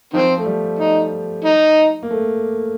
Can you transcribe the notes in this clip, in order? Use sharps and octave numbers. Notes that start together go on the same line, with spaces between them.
D#3 F3 C4
A3
G3
D#4
D#4
A#3
A3